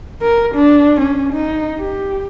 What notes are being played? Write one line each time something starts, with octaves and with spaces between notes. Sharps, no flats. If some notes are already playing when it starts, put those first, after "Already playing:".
A#4
D4
C#4
D#4
G4